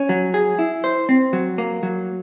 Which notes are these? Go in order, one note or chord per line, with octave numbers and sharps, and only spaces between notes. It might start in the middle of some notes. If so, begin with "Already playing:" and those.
Already playing: C#4
F#3
G#4
E4
C5
C4
F#3
A#3
F#3